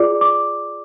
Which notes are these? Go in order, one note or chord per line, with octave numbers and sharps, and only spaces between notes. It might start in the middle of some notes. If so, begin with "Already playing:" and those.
Already playing: F4 G#4 D5 D6
D6